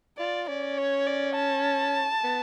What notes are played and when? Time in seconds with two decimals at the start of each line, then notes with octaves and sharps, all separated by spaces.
0.18 F4 D5
0.48 C#4 D5
0.77 C#5
1.07 D5
1.36 A5
2.23 B3